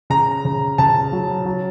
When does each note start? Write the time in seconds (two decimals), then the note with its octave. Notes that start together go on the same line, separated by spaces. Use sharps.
0.10 C#3 A#5
0.45 C#3
0.78 C#3 A5
1.12 F#3
1.45 F#3